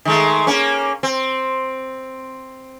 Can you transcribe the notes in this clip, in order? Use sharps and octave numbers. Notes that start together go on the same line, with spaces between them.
D#3 G#3 A3
A#3 C#4
C4